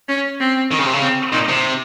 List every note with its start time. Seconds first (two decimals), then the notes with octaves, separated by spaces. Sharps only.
0.08 C#4
0.40 C4
0.71 D#3
0.78 C#3
0.85 C3
0.93 C#3
1.02 C4
1.32 A#2 D#4
1.49 C3